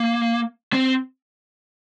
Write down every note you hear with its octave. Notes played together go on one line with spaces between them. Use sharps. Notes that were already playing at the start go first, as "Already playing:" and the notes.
Already playing: A#3
C4